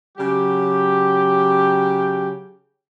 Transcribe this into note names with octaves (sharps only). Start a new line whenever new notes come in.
C#3 F#3 G4